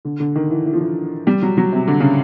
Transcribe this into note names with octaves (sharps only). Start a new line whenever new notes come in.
D3
D3
D#3
E3
E3
F3
E3
G3
F#3
F#3
C3
D3
C#3